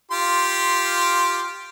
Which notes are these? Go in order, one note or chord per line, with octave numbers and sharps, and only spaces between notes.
F4 G4 C6